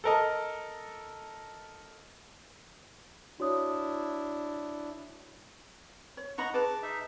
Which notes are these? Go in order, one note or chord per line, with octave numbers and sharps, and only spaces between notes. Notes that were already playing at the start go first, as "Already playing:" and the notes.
A4 A#4 D#5
D4 E4 F#4 C#5 D#6
C#5
D#4 D#5 F#5 A#5 B5 C#6
G#4 B4 A5 D6
D#4 E5